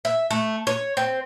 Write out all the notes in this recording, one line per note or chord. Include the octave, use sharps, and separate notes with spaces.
E5
A3
C#5
C4